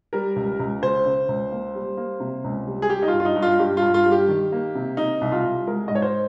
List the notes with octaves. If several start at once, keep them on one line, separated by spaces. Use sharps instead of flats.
G3 A#4
C#2
C#2
C#3 C5
C#3
C#2
A#3
G3
A#3
C3
C#2
G3
G#4
G3 G4
D#4
F4
G2
F4
D#4
G2
F4
G2 G4
G2 F4
F4
G3
G4
D#3
A#3
C3
C3 D#4
C2
F4
C2
G#3 A#4
G#2 D#5
C#5
C5